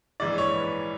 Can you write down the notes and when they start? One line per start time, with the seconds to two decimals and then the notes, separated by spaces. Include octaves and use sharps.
0.20 A#1 G#2 E3 D5
0.38 C#5
0.55 B4